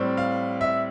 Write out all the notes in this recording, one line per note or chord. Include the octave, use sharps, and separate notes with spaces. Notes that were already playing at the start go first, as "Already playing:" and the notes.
Already playing: A2 G3 C4
F5
E5